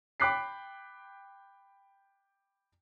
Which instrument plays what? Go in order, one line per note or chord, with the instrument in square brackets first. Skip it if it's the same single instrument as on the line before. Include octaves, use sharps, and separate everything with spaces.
[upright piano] G5 B5 D6 F#6 B6 C7